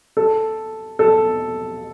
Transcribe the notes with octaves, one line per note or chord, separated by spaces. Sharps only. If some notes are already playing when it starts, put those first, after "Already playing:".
A4
A4